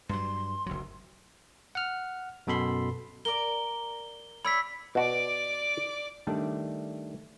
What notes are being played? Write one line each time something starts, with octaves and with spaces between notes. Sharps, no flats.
G2 F#3 C6
F#1 D2 F#3
F#5 F6
F#2 B2 A4 B5 C6
A#4 D5 G7
C#5 D5 B5 E6 B6
B2 F#4 D5 D6
D#3 G3 A3 D4